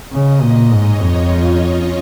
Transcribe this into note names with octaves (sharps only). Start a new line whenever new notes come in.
C#3 D#5
A#2 D#5
G#2 C#5
F2 F4
C#4